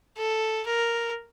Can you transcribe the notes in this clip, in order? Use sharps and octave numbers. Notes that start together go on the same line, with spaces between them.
A4
A#4